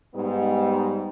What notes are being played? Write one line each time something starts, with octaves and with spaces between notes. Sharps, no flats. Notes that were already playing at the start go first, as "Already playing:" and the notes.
G#2 G3 B3